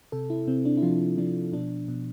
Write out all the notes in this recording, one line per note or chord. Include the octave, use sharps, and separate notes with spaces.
C3 A4
E4
C3 C4
D4
E4
F3 F4
F3 D4
B2 D4
B2